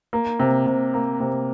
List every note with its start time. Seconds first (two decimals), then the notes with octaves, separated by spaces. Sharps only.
0.13 A#3
0.40 C3
0.67 C3
0.94 A#3
1.20 C3